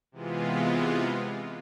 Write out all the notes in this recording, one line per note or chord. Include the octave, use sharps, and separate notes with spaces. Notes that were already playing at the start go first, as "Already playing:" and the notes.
C3 E3 G#3 B3 F4